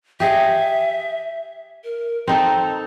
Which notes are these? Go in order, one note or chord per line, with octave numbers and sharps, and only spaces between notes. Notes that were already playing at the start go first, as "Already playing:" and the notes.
G4 G#4 D#5 E5
A#4
C4 D#4 A4 A#5